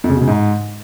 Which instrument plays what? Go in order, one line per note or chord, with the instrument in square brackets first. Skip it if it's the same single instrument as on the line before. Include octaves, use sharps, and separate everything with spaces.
[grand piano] F2
C#3
B2
C#3
G#2